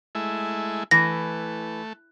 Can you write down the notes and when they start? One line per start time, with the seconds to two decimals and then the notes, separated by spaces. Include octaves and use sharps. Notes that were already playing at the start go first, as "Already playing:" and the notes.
0.15 G#3 A3 E4
0.91 E3 A3 A#6